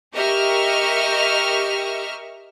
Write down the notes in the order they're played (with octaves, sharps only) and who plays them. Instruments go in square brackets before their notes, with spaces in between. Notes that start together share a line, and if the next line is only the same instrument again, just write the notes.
[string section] G4 A#4 D#5 E5 C#6 F6